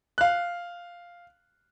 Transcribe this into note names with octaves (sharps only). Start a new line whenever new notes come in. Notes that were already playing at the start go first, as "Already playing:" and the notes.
F5 F#6